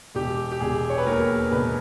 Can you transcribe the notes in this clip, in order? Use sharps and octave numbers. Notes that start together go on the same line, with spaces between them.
E1 G4
G4
E1 G#4
C#5
B4
D#2 A#4
E1 B4